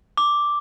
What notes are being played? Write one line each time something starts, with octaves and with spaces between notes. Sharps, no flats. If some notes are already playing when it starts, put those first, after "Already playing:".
D6